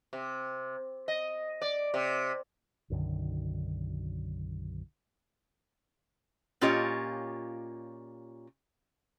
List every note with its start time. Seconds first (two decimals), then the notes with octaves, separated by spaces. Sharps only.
0.13 C3
1.08 D#5
1.62 D5
1.94 C3
2.90 B1 F#2 D3 D#3
6.61 A#2 C#4 F4 G4 C#5 D#5